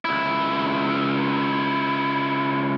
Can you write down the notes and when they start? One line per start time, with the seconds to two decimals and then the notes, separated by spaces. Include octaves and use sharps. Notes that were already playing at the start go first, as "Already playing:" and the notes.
0.05 C#2 E4